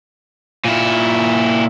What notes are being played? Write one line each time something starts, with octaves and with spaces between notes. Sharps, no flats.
A#2 E4